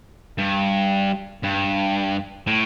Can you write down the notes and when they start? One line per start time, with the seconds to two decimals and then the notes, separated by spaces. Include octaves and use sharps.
0.38 G2
1.43 G2
2.47 A2